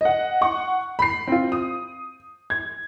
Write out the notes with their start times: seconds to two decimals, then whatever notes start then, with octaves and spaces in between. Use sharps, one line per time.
0.01 D#5 F#5
0.41 F#5 C#6
0.99 B5 C7
1.28 C4 F4
1.52 D#6
2.50 G#6